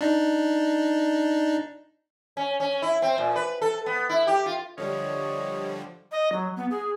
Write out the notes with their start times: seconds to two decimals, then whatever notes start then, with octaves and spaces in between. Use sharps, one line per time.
0.01 D4 D#4
2.37 C#4
2.60 C#4
2.82 E4
3.02 C4
3.18 A#2
3.36 B4
3.62 A4
3.86 B3
4.09 E4
4.27 G4
4.46 F4
4.78 D3 F3 G3 C#5 D#5
6.12 D#5
6.32 F#3
6.57 B3
6.71 G#4